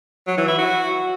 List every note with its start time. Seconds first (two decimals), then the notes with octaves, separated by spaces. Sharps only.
0.27 F#3
0.37 E3
0.48 E4
0.58 F#4